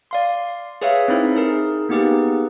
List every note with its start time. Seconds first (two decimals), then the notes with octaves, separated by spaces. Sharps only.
0.11 D5 F5 C6
0.82 G#4 B4 C#5 E5 F5
1.08 C4 D#4 E4 C5 E5
1.35 D#4 G#4 A#4
1.89 A#3 B3 D#4 G4 G#4 B4